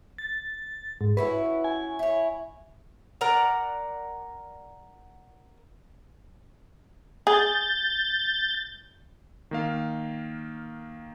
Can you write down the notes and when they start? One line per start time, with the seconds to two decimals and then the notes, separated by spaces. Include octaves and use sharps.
0.18 A6
1.01 G#2
1.17 C#4 E4 F#4 B4
1.64 G#5
1.99 E4 C#5
3.21 A#4 D5 F#5 A#5
7.27 G#4 G6 A6
9.51 D#3 A#3 F5